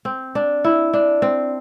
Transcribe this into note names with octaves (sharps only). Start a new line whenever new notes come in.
C4
D4
E4
D4
C4